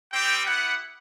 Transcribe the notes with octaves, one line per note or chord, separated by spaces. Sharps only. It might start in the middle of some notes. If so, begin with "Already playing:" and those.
G3 C4 G4 G5
B3 E4 G4 F#5